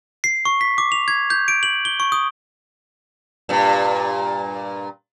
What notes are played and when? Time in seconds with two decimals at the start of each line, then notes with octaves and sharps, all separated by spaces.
0.24 C7
0.45 C#6
0.61 B6
0.78 D6
0.92 F7
1.08 G#6
1.30 G6
1.48 D7
1.63 F#7
1.85 G7
2.00 C#6
2.12 D#6
3.49 G2 A#2